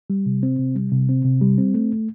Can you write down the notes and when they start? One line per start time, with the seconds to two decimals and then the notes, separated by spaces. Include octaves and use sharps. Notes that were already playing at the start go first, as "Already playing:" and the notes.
0.10 G3
0.26 C3
0.43 C4
0.59 C3
0.76 G3
0.92 C3
1.09 C4
1.25 C3
1.41 G3
1.58 C4
1.74 A3